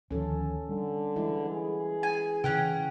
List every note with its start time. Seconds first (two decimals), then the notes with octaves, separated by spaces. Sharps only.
0.11 D2 D#3 F3 C#4 A4
0.69 D3 G3
1.16 E3 G#3 E4
1.50 G#4
2.03 G#5
2.44 C#3 E3 C#4 F#5 G5